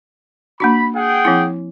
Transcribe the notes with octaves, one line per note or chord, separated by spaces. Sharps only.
A#3 D4 F#4 B5
G#4 F#5 G5
F3 C4 E4